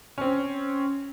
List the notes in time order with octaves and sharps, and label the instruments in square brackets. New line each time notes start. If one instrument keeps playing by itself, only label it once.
[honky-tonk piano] C4 C#4